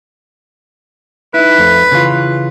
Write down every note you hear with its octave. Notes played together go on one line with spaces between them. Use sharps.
D#4 E4 B4
F2 A3
C#3 E3 F4